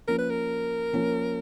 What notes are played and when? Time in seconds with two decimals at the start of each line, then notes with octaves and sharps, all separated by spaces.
0.08 F3 A#3 C#4 A#4
0.19 B4
0.30 A#4
0.93 F3 A#3 C#4